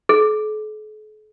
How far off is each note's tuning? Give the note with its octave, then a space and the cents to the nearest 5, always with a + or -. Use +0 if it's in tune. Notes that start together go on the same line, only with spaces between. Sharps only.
A4 -45